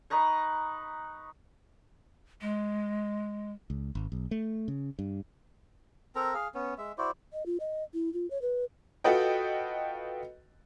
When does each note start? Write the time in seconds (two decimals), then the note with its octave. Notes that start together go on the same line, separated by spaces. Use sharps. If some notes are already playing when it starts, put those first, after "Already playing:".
0.10 D#4 B4 A#5 C#6
2.41 G#3
3.70 C#2
3.95 G#1
4.12 B1
4.31 A3
4.68 C#3
4.99 G2
6.15 C4 A4 A#4 A#5
6.34 G#4 F5
6.55 B3 C#4
6.78 G#3 E5
6.98 E4 F#4 C5 D5
7.33 D#5
7.46 F4
7.60 D#5
7.94 E4
8.14 F4
8.30 C#5
8.42 B4
9.04 F4 F#4 A4 B4 D#5 G5